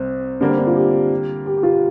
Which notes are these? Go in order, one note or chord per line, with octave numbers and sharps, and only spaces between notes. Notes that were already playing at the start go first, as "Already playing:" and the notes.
Already playing: C2 C4
D3 G3 A#3 D4
C4
D4
F4
G4
G4
G4
F4